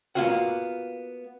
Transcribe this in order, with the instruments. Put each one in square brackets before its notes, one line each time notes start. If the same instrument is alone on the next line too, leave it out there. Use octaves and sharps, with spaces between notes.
[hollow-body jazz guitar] A#3 B3 F4 F#4 F#5